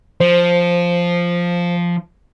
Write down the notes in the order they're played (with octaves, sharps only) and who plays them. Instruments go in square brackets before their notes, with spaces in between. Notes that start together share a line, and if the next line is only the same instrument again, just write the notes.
[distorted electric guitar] F3 [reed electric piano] C5